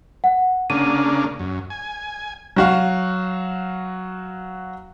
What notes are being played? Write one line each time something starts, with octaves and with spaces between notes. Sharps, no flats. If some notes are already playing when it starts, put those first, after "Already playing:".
F#5
C#3 A#3 D4 D#7
F#2
G#5
F#3 F#4 F5